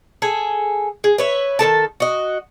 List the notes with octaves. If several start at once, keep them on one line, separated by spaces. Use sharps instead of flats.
G#4 A4 G#5
G#4
B4 C#5 E5
D#3 C4 A4 A5
F#4 D#5